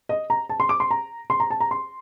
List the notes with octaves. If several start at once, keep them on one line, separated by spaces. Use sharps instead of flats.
D#5
A#5
A5
C6
D6
C6
A#5
C6
A#5
A5
A#5
C6